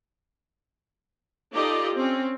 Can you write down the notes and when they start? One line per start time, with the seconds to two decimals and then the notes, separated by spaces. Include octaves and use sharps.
1.52 D#4 F4 G4 A4 D5 D#5
1.95 C4 C#4